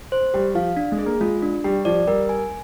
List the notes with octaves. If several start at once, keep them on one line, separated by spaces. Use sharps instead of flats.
C5
G3 G4
F3 F5
D4
G#3
G#4
A#3
G#3 F4
D4
G3 G4
F3 D5
G3 A#4
G#5